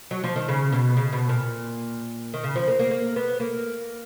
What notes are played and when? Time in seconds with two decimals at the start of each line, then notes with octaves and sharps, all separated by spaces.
0.11 F#3
0.24 F3
0.36 D#3
0.48 C#3
0.72 B2
0.97 C#3
1.13 B2
1.29 A#2
2.34 D#3
2.43 C#3
2.56 F3
2.67 A#3
2.79 A#3
2.91 A#3
3.16 B3
3.40 A#3